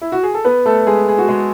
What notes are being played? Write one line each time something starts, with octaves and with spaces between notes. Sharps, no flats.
E4
F#4
G#4
A4
B3 B4
A3 A4
G#3 G#4
G#4
F#4
G#3 G#4